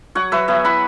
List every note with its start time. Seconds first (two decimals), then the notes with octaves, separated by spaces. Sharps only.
0.15 F#3 C#5 F#5
0.32 F#3 B4 E5
0.48 B3 E5 G#5
0.65 E4 F#5 B5